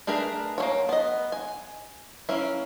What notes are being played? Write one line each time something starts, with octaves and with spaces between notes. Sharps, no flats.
A3 D4 G#4 A#4 B4
A#3 C#4 C#5
B3 D#5
G#5
A#3 C#4 E4